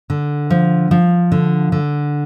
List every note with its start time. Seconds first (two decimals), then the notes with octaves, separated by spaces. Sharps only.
0.10 D3
0.50 F3
0.91 F3
1.32 D3
1.72 D3